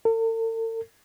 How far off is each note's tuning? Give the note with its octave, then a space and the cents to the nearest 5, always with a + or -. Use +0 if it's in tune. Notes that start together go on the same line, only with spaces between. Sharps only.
A4 +45